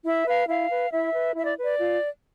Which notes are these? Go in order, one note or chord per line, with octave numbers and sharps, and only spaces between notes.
E4 E5
B4 F5
E4 F5
B4
E4 E5
B4
E4 E5
D5
B4
D5
F4